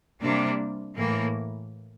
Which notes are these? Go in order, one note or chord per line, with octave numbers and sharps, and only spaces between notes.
C3 G3 A#3 D4
A2 E3 A#3